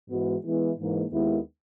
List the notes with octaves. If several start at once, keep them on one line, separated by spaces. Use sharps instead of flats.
G#2 E3 G#3 B3 F#4
E3 G#3 B3 E4
G#2 E3 A#3
D#2 D#3 G#3 B3 E4